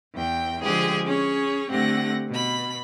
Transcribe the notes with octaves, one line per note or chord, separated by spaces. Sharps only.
E2 G5
D3 F3 G#3 G4 G#4
C#4 G#4 C#5
D3 A3 C4 G4 F#5 A#6
B2 B5